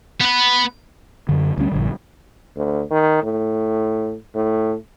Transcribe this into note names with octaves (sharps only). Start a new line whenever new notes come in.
B3 B4
F#2 D3
D2 G3 C#4
A#1 G2 D3
D2
D#3
A2
A2